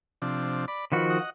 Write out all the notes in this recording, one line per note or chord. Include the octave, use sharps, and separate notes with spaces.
C3 F3 D4
D5 B5
D#3 F3 F#4 B4
D#5 F#5